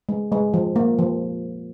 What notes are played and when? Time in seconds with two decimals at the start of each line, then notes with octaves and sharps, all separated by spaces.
0.09 G#3
0.32 G#3
0.54 F3
0.76 A#3
0.99 F3